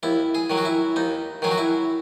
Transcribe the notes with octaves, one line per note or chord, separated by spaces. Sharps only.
D#2 E4
G#4
D#3 F#3
F#4
E4
D#2 D#4
D#3 F#3 G#4
F#4
E4